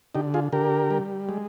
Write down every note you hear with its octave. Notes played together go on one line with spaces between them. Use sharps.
D3 D#4 G4
F4 G#4
D3 G4 A#4
G3
G#3